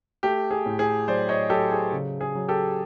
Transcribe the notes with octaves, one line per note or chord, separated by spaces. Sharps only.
A3 G4
G#4
A2
G#4
F#3 C5 D5
C#5 D#5
F#3 G4 A4
G#4
C#3
G#4
F#3
G4 A4